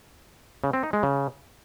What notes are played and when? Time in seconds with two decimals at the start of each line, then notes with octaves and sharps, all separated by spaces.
0.64 C#3
0.73 C4
0.83 D#4
0.93 G#3
1.03 C#3